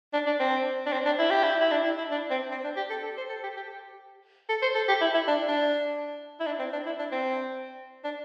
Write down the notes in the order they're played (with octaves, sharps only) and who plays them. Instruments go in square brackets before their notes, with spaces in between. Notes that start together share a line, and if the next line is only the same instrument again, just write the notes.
[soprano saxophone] D4
D4
C4
D4
C4
D4
E4
G4
E4
E4
D4
E4
E4
D4
C4
C4
D4
G4
A4
A4
C5
A4
G4
G4
A4
C5
A4
G4
E4
E4
D4
D4
E4
D4
C4
D4
E4
D4
C4
D4